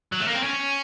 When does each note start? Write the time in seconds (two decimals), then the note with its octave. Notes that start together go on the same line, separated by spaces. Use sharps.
0.12 F#3
0.20 A3
0.27 A#3
0.35 C4
0.43 C#4